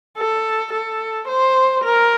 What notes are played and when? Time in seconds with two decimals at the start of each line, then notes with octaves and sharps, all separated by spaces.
0.18 A4
0.73 A4
1.28 C5
1.84 A#4